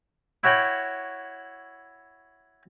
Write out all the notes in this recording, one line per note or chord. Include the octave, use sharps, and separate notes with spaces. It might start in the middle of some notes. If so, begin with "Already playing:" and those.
E4 F#4 C#5 G5 B5